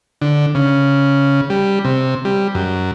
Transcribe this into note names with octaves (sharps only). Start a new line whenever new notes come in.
D3
C#3
G3
C3
G3
F#2